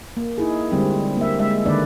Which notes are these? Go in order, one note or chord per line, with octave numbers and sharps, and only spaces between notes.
A#3
D#4 E4 G#4
D3 G3 G#3 C4
A#3 E5
G#3 E5
D3 D#3 A#3 B4 D5